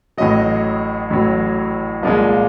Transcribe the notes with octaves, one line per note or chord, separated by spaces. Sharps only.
A1 A2 F#3 D#5
A1 A2 F#3
C2 A#2 F3 G#3 D#5